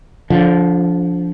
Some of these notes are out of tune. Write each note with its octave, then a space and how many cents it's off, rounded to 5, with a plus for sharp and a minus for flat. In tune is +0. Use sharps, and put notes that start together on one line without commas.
D3 -25 F3 +0